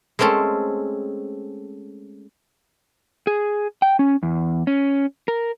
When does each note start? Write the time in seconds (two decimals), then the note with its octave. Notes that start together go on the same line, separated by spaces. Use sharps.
0.19 G#3 A3 C4 C#4 A4
3.27 G#4
3.82 G5
3.99 C#4
4.23 E2
4.67 C#4
5.28 A#4